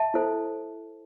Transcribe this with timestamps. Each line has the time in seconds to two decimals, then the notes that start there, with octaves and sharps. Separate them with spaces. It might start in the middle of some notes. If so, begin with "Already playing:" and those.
Already playing: E5 A5
0.14 E4 A4 C5